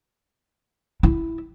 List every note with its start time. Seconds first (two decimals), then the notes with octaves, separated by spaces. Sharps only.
1.03 E4